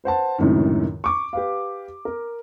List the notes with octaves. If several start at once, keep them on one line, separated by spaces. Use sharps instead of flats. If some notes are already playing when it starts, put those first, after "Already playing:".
B4 C5 F#5 A5
C#2 F#2 A2 C3 D#3
C#6 D6
G4 B4 F5
A#4